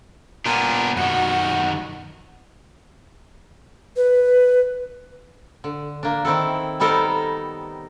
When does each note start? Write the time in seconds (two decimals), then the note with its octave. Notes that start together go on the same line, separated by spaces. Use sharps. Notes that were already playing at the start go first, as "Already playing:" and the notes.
0.45 A#2 B3 D4
0.97 F#2 D#3 F#4
3.96 B4
5.64 D3
6.03 A#3 D4
6.25 D#3 C4 E4 A4
6.80 G3 B3 D#4 A4 A#4 C5